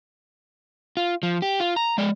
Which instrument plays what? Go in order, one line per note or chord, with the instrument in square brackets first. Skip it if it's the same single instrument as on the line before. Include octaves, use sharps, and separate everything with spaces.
[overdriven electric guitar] F4
F3
G4
F4
A#5
G#3 D5